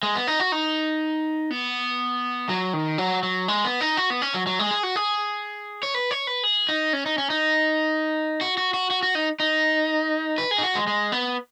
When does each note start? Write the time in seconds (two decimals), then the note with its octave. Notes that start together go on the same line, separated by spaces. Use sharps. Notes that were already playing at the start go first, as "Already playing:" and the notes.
0.03 G#3
0.15 B3
0.27 D#4
0.40 F#4
0.52 D#4
1.51 B3
2.49 F#3
2.73 D#3
2.98 F#3
3.23 F#3
3.48 G#3
3.65 B3
3.81 D#4
3.97 F#4
4.10 B3
4.22 C#4
4.34 F#3
4.47 F#3
4.59 G#3
4.71 G#4
4.83 F#4
4.96 G#4
5.83 C#5
5.95 B4
6.11 C#5
6.27 B4
6.44 G#4
6.69 D#4
6.93 C#4
7.06 D#4
7.18 C#4
7.30 D#4
8.41 F#4
8.57 F#4
8.74 F#4
8.91 F#4
9.03 F#4
9.15 D#4
9.40 D#4
10.38 B4
10.51 G#4
10.58 D#4
10.63 F#4
10.75 G#3
10.87 G#3
11.12 B3